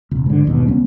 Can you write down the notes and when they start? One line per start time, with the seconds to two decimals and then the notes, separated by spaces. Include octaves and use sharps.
0.11 E1 C#2
0.26 G#2 D3
0.45 G#1 D#2 B2
0.67 C#2 G3 B3 C#4